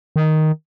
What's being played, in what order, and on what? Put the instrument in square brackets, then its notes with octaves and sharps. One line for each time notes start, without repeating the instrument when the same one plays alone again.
[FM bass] D#3